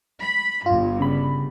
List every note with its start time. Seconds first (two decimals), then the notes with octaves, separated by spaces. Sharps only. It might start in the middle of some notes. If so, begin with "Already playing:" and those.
0.20 B5
0.66 G1 G2 F4
1.00 C#3 B5